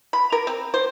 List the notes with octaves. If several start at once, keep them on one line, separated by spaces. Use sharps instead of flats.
B5
A#4
C4
C5